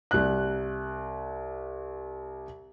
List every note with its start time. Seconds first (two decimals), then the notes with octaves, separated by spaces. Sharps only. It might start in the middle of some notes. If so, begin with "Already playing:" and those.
0.11 C2 F#6